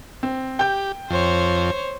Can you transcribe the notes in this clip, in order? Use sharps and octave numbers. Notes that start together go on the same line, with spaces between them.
C4
G4 G5 G6
F2 C5 C#5